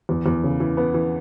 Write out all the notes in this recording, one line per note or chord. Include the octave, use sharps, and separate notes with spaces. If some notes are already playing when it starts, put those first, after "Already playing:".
E2
E2
C#3
E3
B3
E3